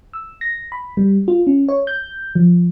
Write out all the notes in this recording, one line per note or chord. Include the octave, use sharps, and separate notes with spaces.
E6
A#6
B5
G3
F4
C#4
C#5
G6
F3